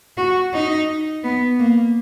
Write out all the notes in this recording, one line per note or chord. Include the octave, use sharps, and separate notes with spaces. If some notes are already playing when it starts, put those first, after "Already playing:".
F#4
D#4
B3
A#3